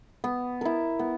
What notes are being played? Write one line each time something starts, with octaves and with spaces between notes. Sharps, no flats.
B3
E4 A#4
B3